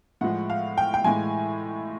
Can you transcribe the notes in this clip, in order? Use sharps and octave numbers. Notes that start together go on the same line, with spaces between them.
A2 F3 G#3 F#5
F5
G5
G5
A2 E3 G#3 G#5